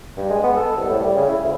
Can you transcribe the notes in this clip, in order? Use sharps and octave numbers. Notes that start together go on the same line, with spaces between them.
G2
G#3
B3
A4
C2
A2
G3
C#3
E4
D2